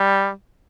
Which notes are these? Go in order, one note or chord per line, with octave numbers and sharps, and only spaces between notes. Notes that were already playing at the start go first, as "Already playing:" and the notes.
Already playing: G3